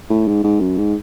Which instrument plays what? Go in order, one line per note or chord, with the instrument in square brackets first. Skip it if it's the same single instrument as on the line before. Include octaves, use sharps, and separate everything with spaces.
[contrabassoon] A2
G#2
G#2
F#2
G#2